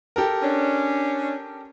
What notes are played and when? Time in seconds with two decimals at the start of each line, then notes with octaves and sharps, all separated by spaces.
0.16 G4 A4 A#4
0.43 C#4 D4